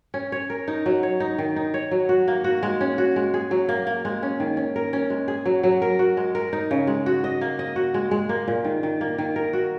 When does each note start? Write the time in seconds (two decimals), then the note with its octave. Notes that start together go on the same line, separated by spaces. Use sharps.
0.14 C#4
0.32 C#5
0.50 A#4
0.68 D#4
0.86 F#3
1.03 C#5
1.20 D#4
1.38 D#3
1.56 D#4
1.74 C#5
1.91 F#3
2.09 F#4
2.28 A#3
2.44 F#4
2.63 G#3
2.81 C#4
2.98 F#4
3.16 G#3
3.34 G#4
3.51 F#3
3.69 A#3
3.87 A#3
4.05 G#3
4.23 C#4
4.40 D#3
4.57 C#4
4.76 A#4
4.93 C#4
5.10 G#3
5.28 G#4
5.45 F#3
5.63 F#3
5.82 A#4
5.99 F#4
6.17 G#3
6.35 A#4
6.53 D#4
6.71 C#3
6.87 G#3
7.06 F#4
7.24 D#5
7.41 A#3
7.59 D#5
7.76 F#4
7.94 G#3
8.11 G#3
8.29 A#3
8.48 A#2
8.65 D#3
8.83 D#3
9.01 A#3
9.18 D#3
9.36 A#4
9.53 F#4